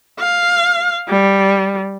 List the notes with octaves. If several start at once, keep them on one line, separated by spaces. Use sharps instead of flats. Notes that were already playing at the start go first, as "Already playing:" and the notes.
F5
G3